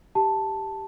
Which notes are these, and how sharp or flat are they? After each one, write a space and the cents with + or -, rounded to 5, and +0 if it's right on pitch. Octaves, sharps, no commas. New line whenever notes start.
G4 +0 A5 +0